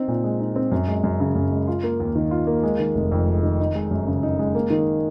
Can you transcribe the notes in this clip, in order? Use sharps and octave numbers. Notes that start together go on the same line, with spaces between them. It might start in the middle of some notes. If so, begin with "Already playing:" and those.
Already playing: C4 D#4
A#2
G#3
D#4
C4
F#2
G#3
F#2
C#3
F#2
G#3
F4
A#3
D#2
D#3
F4
A#3
G#3
D#3
F1
F2
G#3
D#3
D#4
G#3
F#2
C#3
D#4
G#3
A#3
D#3